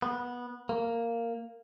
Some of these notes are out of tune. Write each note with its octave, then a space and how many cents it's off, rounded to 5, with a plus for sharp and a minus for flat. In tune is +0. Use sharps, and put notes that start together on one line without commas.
B3 -15
A#3 -10